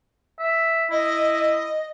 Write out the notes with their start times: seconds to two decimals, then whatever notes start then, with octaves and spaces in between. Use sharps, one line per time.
0.40 E5
0.91 E4 D#5